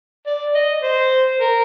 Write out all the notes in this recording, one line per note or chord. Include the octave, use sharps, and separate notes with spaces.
D5
D#5
C5
A#4